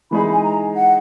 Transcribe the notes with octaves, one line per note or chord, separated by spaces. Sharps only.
E3 G#3 D#4 G#4 B5
G#5
A#5
F#5